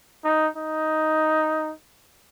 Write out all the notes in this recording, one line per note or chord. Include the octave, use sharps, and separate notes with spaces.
D#4
D#4